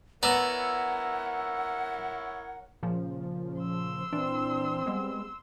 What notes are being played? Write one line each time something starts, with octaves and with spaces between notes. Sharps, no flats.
B3 E4 A#4 C#5 D5 F#5 A#5 E6
A#2 C#3 F3
C6 E6
A#2 E3 C4 D4
G3 G#3 B3